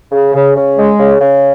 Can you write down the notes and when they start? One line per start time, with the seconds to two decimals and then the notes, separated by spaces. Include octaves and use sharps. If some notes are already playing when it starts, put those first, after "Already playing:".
0.12 C#3
0.34 C#3
0.56 C#3
0.77 G#3
1.00 C#3
1.21 C#3